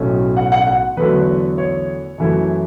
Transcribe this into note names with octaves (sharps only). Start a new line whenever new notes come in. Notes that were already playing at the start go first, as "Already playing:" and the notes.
Already playing: B1 A2 F#3 A3 C#4
F#5
F#5
F#5
E2 D3 F#3 A3 B4
C#5
F#2 E3 A3 E4